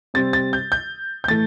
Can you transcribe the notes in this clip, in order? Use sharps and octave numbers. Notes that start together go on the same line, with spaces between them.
C3 G3 C4 A6
A6
G6
G6
G6
A2 E3 A3 A6